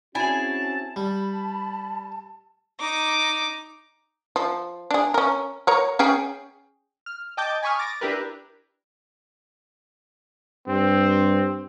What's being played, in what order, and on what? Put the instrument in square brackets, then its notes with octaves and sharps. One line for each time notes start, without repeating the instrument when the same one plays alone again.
[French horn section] C4 C#4 F#4 [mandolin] E4 G#4 [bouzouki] G#5 [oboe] A5
[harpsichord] G3 [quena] A5 [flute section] B5
[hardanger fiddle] D#4 D6
[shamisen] F3
D4 G#4
C#4 A#4
A#4 C#5 A#5
C#4 G#4 G5
[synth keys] F6
D#5 G5 A5 D6 G6 A6
G#5 B5 C#6 D#6 F6
D6 A6 A#6
D4 E4 G4 A#4 B4
[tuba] G2 [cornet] C4